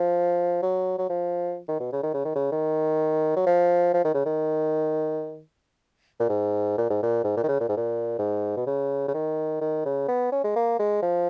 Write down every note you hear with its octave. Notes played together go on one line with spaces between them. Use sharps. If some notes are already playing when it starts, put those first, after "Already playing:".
Already playing: F3
F#3
F#3
F3
D#3
B2
C#3
D#3
C#3
D#3
C#3
D#3
F#3
F3
F3
D#3
C#3
D#3
A#2
G#2
A#2
G#2
A#2
G#2
A#2
D#3
C#3
A#2
G#2
A#2
G#2
B2
C#3
C#3
D#3
D#3
C#3
B3
C#4
G#3
A#3
G#3
F3